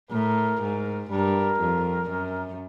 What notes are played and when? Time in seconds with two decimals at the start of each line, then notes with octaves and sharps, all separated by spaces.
0.11 A2 A#4
0.61 G#2
1.10 G2 A#4
1.60 F2
2.09 F#2